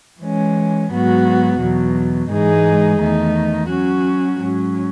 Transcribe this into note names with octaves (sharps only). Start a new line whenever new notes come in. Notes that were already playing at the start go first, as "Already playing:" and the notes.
E3 G#3 C#4
G#2 F#3 B3 F#4
E2 B2 F#3
G#2 E3 G#3 D#4 G#4
E2 D#3 A3 D#4
F#3 C#4 F#4
G#2 F#3 C#4